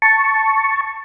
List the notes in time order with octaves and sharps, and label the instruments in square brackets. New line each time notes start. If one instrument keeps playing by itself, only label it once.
[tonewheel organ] A5 C#6